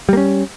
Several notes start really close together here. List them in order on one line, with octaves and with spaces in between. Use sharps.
G3 A#3 C#4